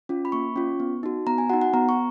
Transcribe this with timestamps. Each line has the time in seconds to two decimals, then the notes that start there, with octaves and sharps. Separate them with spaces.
0.09 C#4 F4
0.25 B5
0.32 A#3 C#6
0.56 C#4 F4
0.80 B3
1.03 D#4 F#4
1.27 B3 A#5
1.38 G#5
1.50 D#4 F#4 F#5
1.61 F#5
1.73 B3 A#5
1.89 C#6